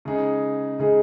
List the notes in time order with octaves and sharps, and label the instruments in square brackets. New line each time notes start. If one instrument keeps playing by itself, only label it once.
[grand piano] C#3 G#3 D#4 G#4
C#3 G#3 D#4 G#4